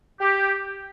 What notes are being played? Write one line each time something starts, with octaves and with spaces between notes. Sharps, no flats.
G4